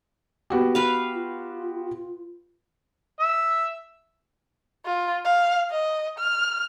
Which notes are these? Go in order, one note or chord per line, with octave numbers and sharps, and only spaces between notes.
B3 F#4 G4
B4 F5
F4
E5
F4
F5
D#5
F6